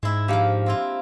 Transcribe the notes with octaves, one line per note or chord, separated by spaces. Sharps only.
G#2 G#3 E4 E5
F3 A#3 D4 G4 F5
C4 E4 F4